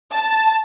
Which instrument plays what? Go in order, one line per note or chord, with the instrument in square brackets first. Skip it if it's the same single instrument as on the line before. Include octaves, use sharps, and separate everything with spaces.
[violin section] A5